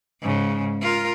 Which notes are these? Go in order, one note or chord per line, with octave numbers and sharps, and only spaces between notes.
G#2 C#3
F4 A#4